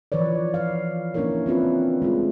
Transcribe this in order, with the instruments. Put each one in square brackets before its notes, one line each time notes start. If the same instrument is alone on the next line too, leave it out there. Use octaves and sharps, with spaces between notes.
[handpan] E3 F3 B4 C#5 D5
F5
A#3 C#4 D4 E4 A#4 C#5
C4 F4 B4 E5
G#3 A3 F4